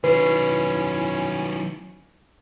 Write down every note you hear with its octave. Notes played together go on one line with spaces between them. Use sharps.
D#3 F#3 C#4 E4 B4